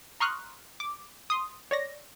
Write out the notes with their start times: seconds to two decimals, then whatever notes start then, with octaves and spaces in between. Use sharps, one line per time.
0.20 A#5 C6 C#6 D#6 F6 F#6
0.80 D6
1.30 C6 D#6
1.71 C#5 D5 A#6